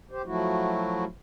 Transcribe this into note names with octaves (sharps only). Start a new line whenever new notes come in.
G4 C5
F3 F#3 A3 E4 F#4